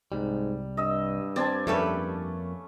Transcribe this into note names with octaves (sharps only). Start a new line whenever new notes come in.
C2 G#2 G3
G2 D#5 E6
C4 D5 G#5 A5
F2 A3 A#3 C#4 G4 A4 B4